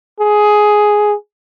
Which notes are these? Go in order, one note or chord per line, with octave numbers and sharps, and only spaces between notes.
G#4